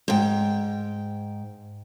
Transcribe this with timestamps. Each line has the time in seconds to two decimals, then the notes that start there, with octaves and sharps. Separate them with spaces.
0.08 G#2 G5